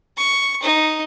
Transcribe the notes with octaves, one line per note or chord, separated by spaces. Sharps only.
C#6
D#4